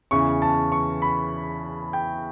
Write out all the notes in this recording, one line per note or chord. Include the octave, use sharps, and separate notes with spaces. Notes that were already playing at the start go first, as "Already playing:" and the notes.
E2 C#3 E3 C#6
A5
C#6
B5
G5